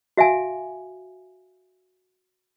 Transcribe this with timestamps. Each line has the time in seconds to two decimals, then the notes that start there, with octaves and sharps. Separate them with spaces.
0.17 F#4 E5 F5 G#5